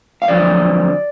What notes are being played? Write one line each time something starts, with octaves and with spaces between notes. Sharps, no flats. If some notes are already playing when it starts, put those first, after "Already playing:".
F5
F2 D3 F#3 D5